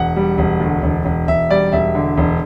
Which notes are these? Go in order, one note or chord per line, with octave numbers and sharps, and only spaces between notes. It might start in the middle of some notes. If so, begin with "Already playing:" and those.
Already playing: E1 F#5
G3
E1
D2
E1
E1
E1 E5
G3 D5
E1 E5
D3
E1